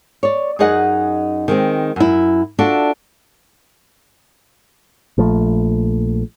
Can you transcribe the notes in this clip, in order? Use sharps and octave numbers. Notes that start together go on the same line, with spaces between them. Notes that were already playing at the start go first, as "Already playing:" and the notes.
C#5 D5
F#2 D#4 G#4 D#5 F#5
D#3 G#3 C4
F#2 E4
D4 F4 F#4 A4 D5 E5
A#1 F3 A3